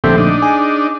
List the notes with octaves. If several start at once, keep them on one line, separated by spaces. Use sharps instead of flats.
A#1 D3 A3 C4 G4 E5
D4 D#4
G#4